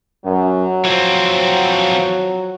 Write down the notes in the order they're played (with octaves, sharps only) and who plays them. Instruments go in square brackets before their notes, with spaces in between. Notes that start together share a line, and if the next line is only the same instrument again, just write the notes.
[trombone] F#2 [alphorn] F#3
[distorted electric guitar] E3 C4 [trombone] F3